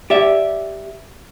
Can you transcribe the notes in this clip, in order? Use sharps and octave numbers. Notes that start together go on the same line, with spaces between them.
G4 D5 E5